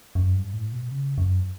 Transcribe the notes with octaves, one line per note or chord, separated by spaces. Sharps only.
F#2
G2
A2
B2
C#3
F#2